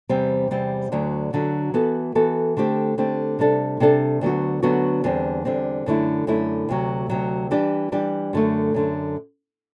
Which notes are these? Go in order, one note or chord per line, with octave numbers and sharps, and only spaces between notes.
E2 C3 G3 C4
E2 C3 G3 C4
D2 D3 F#3
D2 D3 F#3
E3 B3 F#4 A4
E3 B3 F#4 A4
D3 A3 C4 G4
D3 A3 C4 G4
C3 G3 D4 A4
C3 G3 D4 A4
D2 D3 F#3 B3 F#4
D2 D3 F#3 B3 F#4
E2 D3 G3 C4
E2 D3 G3 C4
F#2 D3 A3 E4
F#2 D3 A3 E4
D2 C3 F#3
D2 C3 F#3
E3 G3 D4 G4
E3 G3 D4 G4
F#2 D3 A3
F#2 D3 A3